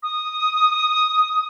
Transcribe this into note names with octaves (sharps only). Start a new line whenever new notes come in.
D#6